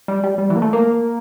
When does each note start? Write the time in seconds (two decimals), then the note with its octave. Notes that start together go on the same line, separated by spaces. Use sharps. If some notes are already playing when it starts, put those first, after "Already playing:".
0.08 G3
0.24 G3
0.38 G3
0.50 E3
0.56 A#3
0.62 A3
0.73 A#3